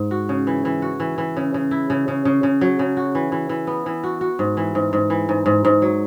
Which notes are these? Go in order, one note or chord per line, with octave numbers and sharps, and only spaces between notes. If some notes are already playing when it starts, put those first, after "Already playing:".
Already playing: G#2
F#4
C#3
E3
E3
F#4
E3
E3
C#3
C#3
E4
C#3
C#3
C#3
C#3
F#3
C#3
F#4
E3
E3
E3
B3
E3
F#4
F#4
G#2
E3
G#2
G#2
E3
G#2
G#2
G#2
F#3